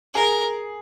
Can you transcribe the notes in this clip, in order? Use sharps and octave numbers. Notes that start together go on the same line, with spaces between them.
G#4 A#4